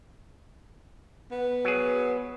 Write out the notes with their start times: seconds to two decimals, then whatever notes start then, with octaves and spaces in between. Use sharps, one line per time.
1.32 B3
1.65 F#3 G#4